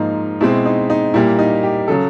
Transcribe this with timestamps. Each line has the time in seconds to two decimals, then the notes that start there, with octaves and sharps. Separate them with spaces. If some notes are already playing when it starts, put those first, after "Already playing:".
Already playing: G#2 F3 A#3 D#4
0.41 B2 G#3 C4 E4
0.66 D#4
0.90 D#4
1.14 A#2 G3 A#3 E4
1.39 D#4
1.63 G4
1.88 C#3 F#3 A4